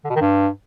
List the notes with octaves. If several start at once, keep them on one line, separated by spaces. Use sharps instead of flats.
D3
B2
D#3
G2